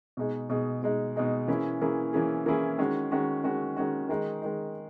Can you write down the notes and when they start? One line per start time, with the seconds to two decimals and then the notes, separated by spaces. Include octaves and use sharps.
0.17 B2 G#3 D#4 G#4
0.49 B2 G#3 D#4 G#4
0.83 B2 G#3 D#4 G#4
1.16 B2 G#3 D#4 G#4
1.48 E3 A#3 C#4 E4 G#4
1.81 E3 A#3 C#4 E4 G#4
2.13 E3 A#3 C#4 E4 G#4
2.46 E3 A#3 C#4 E4 G#4
2.78 D#3 G#3 C#4 F#4
3.11 D#3 G#3 C#4 F#4
3.44 D#3 G#3 C#4 F#4
3.77 D#3 G#3 C#4 F#4
4.09 D#3 G#3 D#4
4.42 D#3 G#3 D#4